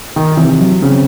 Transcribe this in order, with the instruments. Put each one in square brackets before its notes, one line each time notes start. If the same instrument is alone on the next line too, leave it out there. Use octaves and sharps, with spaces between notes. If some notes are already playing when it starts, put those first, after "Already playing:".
[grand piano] D#3
[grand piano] C3 [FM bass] E3
[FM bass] F#3
[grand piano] C#3 [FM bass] C4